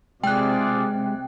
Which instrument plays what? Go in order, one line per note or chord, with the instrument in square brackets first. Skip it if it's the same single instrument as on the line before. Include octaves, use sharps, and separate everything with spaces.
[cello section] C3 [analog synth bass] G#3 [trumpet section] F4 G#4 D5 [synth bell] G5 F#6